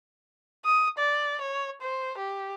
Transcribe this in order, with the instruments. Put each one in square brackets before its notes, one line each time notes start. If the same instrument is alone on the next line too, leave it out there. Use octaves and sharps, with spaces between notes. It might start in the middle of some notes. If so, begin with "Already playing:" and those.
[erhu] D#6
D5
C#5
C5
G4